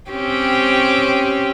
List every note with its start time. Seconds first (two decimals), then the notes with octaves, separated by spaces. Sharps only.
0.11 C4 C#4 G4